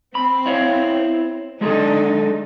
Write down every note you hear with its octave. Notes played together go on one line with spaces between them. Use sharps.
C4 B5
E4 C#5 F5
D3 G#3 D#4 G#4 A4